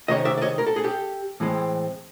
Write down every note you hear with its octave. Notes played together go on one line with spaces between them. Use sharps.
C3 D#3 G#3 C#4 C#5 D#5
D5 E5
D5
C#5 D#5
A#4
A4
G#4
G4 A4
A2 E3 G#3 C4